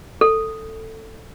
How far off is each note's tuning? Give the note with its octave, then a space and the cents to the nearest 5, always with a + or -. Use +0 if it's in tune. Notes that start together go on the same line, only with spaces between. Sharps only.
A4 +15